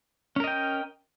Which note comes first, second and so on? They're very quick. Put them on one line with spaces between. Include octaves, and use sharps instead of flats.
C#4 A#4 D#5 G5